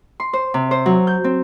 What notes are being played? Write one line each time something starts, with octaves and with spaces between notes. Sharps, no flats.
C6
C5
C3
C5
F#3
G6
C4